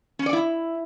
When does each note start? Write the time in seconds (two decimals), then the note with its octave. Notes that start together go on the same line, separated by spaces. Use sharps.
0.19 C#4
0.26 D5
0.33 E4